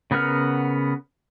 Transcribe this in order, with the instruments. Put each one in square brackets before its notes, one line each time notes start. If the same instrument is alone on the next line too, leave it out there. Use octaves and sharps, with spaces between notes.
[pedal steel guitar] C#3 B3 A#4 F#5 F6